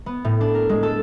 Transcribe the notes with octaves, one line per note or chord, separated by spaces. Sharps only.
B3
A2
D4
A#4
G#3
A4